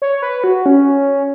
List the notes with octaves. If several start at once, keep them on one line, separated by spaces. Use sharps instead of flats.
C#5
B4
F#4
C#4